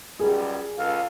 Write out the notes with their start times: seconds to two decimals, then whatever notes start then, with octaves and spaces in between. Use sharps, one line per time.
0.19 C#2 F#2 G3 G#4
0.78 C#2 A4 F5